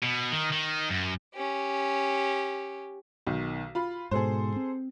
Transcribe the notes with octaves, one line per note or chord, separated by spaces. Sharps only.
B2
D#3
D#3
F#2
C#4 G4
B1 D#3
F4 B5
G#2 B2 G#4 A4 C5
C4